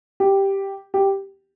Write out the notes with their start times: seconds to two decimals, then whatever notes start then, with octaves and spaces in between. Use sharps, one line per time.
0.20 G4
0.94 G4